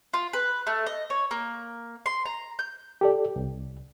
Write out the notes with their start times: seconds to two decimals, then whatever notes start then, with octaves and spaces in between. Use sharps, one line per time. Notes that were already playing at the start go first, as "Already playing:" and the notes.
0.14 F4
0.33 B4
0.67 A3
0.86 D#5
1.10 C#5
1.31 A#3
2.06 C6
2.26 A#5
2.59 G6
3.01 G4 A4 D5
3.36 C2